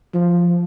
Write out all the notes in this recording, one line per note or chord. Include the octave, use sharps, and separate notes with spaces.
F3